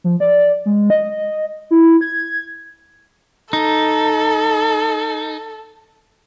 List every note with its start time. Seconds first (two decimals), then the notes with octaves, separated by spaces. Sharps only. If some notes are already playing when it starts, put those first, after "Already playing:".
0.04 F3
0.20 D5
0.66 G#3
0.90 D#5
1.71 E4
2.01 G#6
3.53 D#4 A4